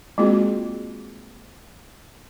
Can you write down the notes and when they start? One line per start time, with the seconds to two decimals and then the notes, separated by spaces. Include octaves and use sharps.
0.18 G#3 A#3 C4 F4 F#4 G#4